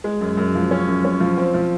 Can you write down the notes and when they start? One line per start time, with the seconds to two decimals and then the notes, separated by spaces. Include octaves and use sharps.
0.04 G#3
0.21 F#2
0.37 F#2
0.55 F3
0.71 C#4
0.87 F#2
1.05 C#4
1.20 F3
1.37 C4
1.54 F3